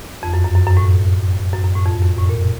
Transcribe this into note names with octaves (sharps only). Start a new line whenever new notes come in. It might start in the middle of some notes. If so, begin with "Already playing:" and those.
F2
F#2
F#2
F#2
F#2
A2
F#2
F#2
A2
F2
F#2
A2
A#2